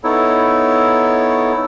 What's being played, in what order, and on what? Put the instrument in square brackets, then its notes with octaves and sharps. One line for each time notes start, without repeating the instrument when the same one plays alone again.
[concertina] B3 D#4 E4 A4 C#5